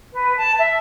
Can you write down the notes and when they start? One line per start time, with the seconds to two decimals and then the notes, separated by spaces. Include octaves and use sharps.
0.14 B4
0.37 A5
0.58 E5